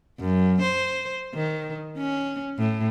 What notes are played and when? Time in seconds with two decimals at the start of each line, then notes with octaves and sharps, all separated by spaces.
0.20 F#2
0.62 C5
1.34 D#3
1.97 C#4
2.58 A2